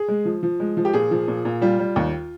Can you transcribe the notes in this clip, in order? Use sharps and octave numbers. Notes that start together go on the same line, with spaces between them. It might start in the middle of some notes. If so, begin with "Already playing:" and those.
Already playing: G#4
G#3
F3
F3
G#3
F3
G4
A#2 G#4
F3
A#2
A#2
G3 F4
G3
D#2